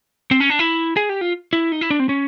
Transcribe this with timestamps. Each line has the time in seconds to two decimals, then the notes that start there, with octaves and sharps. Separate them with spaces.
0.31 C4
0.40 C#4
0.50 D4
0.59 E4
0.97 G#4
1.09 G4
1.21 F4
1.53 E4
1.72 D#4
1.81 E4
1.91 D4
2.00 C4
2.09 C#4